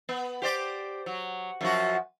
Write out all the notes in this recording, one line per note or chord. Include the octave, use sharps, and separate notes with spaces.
B3
G4 C5 D5
F#3
F#2 F3 F#4